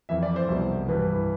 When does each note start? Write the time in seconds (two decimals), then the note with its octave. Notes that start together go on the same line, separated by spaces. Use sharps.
0.09 F2 E3 E5
0.23 D5
0.36 C5
0.48 C2 B2
0.89 G2 E3 B4